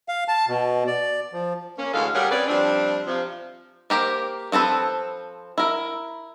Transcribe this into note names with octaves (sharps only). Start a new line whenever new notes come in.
F5
A5
B2
D5
F3
A#3 C#4
D2 E3 G#3 F4 A4 F5
G3 G4 G#4 A#4 C#5 F#5
C4 C#4 B4 D5
F3 G3 C4 D4
C3 F3
A#3 G4 A#4 C5
F3 C4 A4 B4
E4 A#4